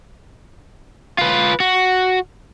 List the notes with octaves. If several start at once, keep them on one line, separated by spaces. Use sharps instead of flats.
F4 B4
F#4